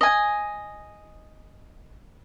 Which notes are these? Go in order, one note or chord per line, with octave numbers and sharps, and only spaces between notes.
D#5 G#5